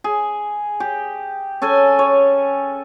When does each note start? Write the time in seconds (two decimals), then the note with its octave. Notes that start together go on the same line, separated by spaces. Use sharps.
0.04 G#4
0.80 G4
1.62 C#4 A4 G#5
1.99 C#5